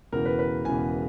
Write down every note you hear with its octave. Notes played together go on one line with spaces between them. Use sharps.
E1 E2 C#3 A#4
B4
B4
E1 E2 C#3 G#5